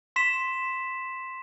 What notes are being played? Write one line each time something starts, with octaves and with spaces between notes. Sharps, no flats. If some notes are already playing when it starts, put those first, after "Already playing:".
C6 B6 E7